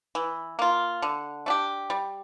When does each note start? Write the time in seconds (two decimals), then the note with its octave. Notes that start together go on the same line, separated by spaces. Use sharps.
0.15 E3
0.59 A#3 F4
1.02 D3
1.46 A3 D4 G4
1.90 G3